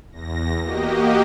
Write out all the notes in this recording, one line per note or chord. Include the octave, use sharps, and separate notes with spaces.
E2 A#6
A#3 F#4 G4 D#5